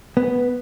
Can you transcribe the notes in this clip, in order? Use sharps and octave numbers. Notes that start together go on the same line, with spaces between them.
B3